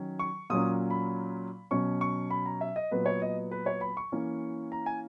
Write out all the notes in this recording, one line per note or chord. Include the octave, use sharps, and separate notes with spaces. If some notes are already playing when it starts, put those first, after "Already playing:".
Already playing: D#3 F#3 C#4
C#6
A#2 F#3 A#3 C#4 D#6
B5
B2 F#3 C#4 C#6
C#6
B5
A#5
E5
D#5
A#2 F#3 B3 B4
C#5
D#5
B4
C#5
B5
C#6
E3 A#3 C#4
A#5
G#5